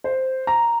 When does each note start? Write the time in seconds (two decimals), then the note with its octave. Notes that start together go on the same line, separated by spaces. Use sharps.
0.04 C5
0.47 A#5